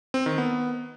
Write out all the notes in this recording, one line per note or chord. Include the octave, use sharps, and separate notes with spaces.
C4
D#3
B3